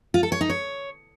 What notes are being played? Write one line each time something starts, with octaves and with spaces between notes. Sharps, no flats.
F4
A4
C#5
D#4
C#5